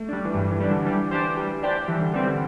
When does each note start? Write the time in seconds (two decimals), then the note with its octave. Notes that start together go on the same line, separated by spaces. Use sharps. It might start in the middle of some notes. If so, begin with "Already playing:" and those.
Already playing: A3
0.08 G3 D4
0.25 E3
0.34 G2 G3
0.51 E3
0.60 G3 D4
0.69 D3
0.85 E3 G3
1.11 D4 G4 C5
1.37 G3
1.63 D4 G4 C5
1.88 E3 G3
2.01 D3
2.14 E3 G3 C4
2.27 D3